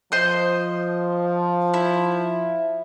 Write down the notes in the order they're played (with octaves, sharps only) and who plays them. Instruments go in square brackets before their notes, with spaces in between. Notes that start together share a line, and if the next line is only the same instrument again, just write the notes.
[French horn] F3 [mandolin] C5 D#5
[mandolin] E4